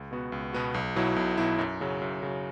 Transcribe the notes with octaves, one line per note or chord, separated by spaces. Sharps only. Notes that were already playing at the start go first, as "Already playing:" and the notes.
Already playing: C#2
B2 B3 F#4
C#2
B2 B3 F#4
B1
B2 F#3 E4
B1
B2 F#3 E4
F#2
C#3 F#3
F#2
C#3 F#3